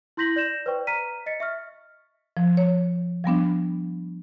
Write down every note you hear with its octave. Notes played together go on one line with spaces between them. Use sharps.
E4 C6 G6 A#6 B6 F#7
D5 G6 A#6 E7
B4 C5 D5 G5 C#6
A#5 F6 B6 D#7
D#5 A6 B6 C#7
E5 C#6 F6
F3
C#5
F3 G3 B3 D4